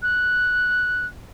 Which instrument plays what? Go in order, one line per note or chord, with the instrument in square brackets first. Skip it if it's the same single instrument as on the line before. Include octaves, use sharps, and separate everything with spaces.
[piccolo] F#6